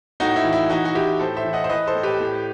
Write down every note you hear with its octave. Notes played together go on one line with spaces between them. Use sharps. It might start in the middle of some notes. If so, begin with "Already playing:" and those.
A2 D#4 F#4
E4
E3
E4
E3 D#4 F#4
F#4
E3 E4 G4
A2 A4 C5
C5 E5
E3
D#5 F#5
C5
E3 B4 D#5
A4 C5
A2
G4 B4
A2